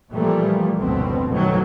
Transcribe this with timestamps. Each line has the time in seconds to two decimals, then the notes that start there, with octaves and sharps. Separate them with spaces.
0.11 A#2 E3 F3 G3 A3 A#3
0.79 F#1 D2 B2 B3 C4
1.32 B2 D#3 F3 F#3 A3